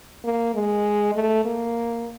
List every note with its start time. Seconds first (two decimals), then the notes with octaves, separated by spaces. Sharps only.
0.24 A#3
0.54 G#3
1.15 A3
1.45 A#3